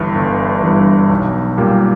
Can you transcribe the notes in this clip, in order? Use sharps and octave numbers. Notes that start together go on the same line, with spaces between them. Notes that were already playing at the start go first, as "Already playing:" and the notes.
Already playing: G1 G2 E3
G1
G2 E3
B1
A#2 G3 A#3